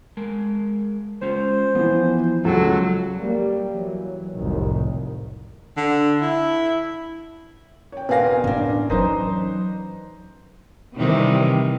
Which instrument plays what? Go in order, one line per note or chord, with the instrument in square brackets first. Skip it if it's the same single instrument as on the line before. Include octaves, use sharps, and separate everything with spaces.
[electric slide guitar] G#3 A#4
[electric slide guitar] G#3 C#4 F4 [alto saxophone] C5
[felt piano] E3 B3 [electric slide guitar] F3
[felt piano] C#2 [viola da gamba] F#3 [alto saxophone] A4
[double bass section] G3 A#3
E3 F#3
F1 C2 A2 D#3
[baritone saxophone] D3
E4
[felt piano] C#5 G5
[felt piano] E1 G#5 A#6 [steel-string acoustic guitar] B4 F5 G5
[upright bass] A2 [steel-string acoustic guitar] C#4 D4
[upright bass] E3 F#3 [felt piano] D#4 B4 C5
[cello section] C3 D#3 E3 G3